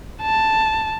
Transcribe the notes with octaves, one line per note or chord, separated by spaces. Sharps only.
A5